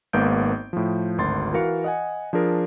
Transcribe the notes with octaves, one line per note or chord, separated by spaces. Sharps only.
G#1 G#2 A#3 B3 G6 D7
A2 F3
G#1 D2 C6 A6
E3 F#4 A#4 F5 C#7
D#5 F#5 G#5
F3 D4 G#4 A#4